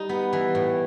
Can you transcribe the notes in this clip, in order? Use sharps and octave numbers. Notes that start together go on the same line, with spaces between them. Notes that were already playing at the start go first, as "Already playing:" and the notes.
Already playing: G3 D#4
B3
E3
A2